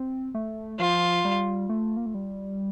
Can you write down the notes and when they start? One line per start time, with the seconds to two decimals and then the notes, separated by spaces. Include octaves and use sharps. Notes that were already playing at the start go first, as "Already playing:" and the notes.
Already playing: C4
0.35 A3
0.79 F3 F4
1.25 G3
1.69 A3
1.97 A#3
2.06 A3
2.14 G3